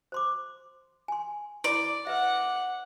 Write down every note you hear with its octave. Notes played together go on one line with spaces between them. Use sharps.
C5 C6 D6
G#5 C6
E4 D5 B5 C6
B4 E5 F#5